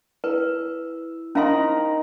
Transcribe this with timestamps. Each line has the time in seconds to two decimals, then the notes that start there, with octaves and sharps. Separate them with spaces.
0.24 E4 B4
1.35 C#4 D#4 A#4 F5 C6